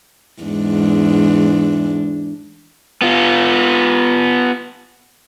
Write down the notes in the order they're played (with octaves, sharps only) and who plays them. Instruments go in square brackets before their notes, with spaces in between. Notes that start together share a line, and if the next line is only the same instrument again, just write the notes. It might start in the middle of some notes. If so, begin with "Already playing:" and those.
[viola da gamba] E2 G#2 D4
[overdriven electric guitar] B3 F4